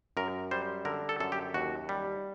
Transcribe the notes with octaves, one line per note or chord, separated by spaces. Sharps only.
F#2 A#4
G3 C5
D3 A#4
A4
F#2 A4
G4
D#2 F#4
G3